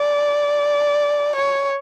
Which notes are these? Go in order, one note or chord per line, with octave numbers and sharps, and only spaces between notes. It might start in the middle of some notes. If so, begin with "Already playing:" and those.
Already playing: D5
C#5